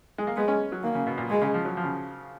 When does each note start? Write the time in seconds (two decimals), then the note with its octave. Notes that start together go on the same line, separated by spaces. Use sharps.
0.18 G#3
0.27 A#3
0.36 G#3 B3
0.48 C#4
0.72 F#3
0.83 D#3 A#3
0.95 C#3
1.07 B2
1.18 A#2
1.30 B2 G#3
1.41 C#3
1.54 F3
1.65 F#3
1.77 F3
1.84 C#3